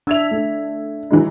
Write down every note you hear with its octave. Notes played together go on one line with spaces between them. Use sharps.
D4 E5 E6 G#6 F7
A3
E3 F#3 G#3